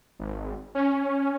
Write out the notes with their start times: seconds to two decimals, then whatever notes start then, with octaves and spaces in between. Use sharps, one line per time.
0.20 G#1
0.75 C#4